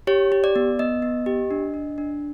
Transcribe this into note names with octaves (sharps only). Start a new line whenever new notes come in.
G4 C#5
G4
D5
B3
B3 D#5
B3
G4
D4
D4
D4